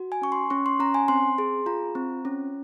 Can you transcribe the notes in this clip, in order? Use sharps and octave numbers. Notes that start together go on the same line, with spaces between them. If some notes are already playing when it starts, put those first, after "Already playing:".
Already playing: F#4
G#5
C#4 C#6
C6
C#4 C#6
C6
C#4 A#5
G#5
C4 C6
G#4
F4 A#5
C4
C#4